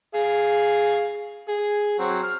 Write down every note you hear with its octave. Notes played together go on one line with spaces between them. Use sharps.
G#4 F5
G#4
F#3 C4
F6